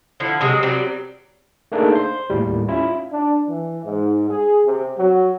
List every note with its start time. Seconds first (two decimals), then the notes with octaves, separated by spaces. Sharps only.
0.20 D3 F3 E4
0.41 C3 F#3 G#3
0.63 F#3 G3 C4 D5
1.72 A3 A#3 D4 D#4 G#4 A4
1.92 C5 C6
2.30 D#2 A2 G3
2.68 C#4 E4 F4
3.13 D4
3.48 E3
3.84 G#2
4.29 G#4
4.65 C3
4.97 F#3